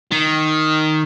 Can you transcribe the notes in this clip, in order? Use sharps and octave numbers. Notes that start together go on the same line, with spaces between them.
D#3